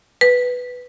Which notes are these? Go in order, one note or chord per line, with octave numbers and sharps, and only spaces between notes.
B4